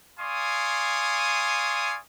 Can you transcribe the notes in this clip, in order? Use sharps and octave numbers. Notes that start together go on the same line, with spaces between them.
D5 F5 G#5 C6 C#6 D#6